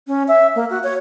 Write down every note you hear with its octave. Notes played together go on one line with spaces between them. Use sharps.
C#4
E5
A#3
F#4
C#5